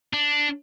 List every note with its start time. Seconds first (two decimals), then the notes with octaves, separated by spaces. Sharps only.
0.14 D4